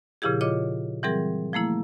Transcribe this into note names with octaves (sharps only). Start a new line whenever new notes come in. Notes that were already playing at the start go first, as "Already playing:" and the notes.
A#2 C#3 F3 E4 G4 G#4
F4 C#5 D#5 D6
E3 F#3 G3 C4 G#4 A#4
F3 A3 A#3 E4